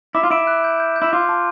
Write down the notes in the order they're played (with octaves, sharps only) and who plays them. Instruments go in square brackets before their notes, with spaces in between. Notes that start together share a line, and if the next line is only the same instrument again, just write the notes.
[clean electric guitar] E4 [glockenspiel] D6
[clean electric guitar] F4
[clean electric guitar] E4 [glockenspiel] D7
[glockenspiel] F#6
G6
G6
G6
[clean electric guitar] E4
[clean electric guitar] F4 [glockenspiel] D6
[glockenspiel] A5